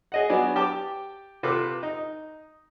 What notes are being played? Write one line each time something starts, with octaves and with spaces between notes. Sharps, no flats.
G#4 D#5 F#5
F#3 B3 D4 G#5
G4 G5 A5 D6
C3 F4 A4 B4 D6
D#4